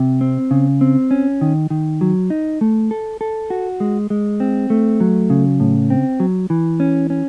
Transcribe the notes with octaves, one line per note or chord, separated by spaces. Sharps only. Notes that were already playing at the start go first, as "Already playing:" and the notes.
Already playing: C3
C4
C#3
C4
C#4
D#3
D#3
F#3
D#4
A3
A4
A4
F#4
G#3
G#3
C4
A3
F#3
C#3
A2
C4
F#3
E3
C#4
C#4